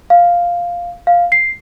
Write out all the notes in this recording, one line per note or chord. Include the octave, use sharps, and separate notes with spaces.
F5
F5
C7